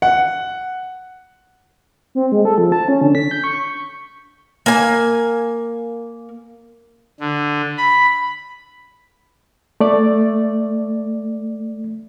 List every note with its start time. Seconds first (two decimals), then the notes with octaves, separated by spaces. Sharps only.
0.02 F#5
2.15 C4
2.32 G#3
2.45 A4
2.58 F3
2.72 A5
2.88 C#4
3.01 D3
3.15 B6
3.31 G6
3.44 C#6
4.66 A#3 G#5
7.20 D3
7.78 B5
9.80 A3 D5